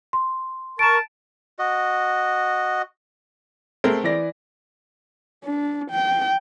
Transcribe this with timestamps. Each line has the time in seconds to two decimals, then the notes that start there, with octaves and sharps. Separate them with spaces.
0.13 C6
0.79 A#4 A5 C#6 D7 E7
1.59 F#4 D#5
3.84 G#3 A3 C4 A#4
4.04 E3 D5 A#6
5.45 D4
5.91 G5